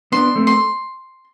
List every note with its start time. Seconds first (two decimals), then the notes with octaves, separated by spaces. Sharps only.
0.12 B3 D4 C6
0.35 A3 C4
0.47 C6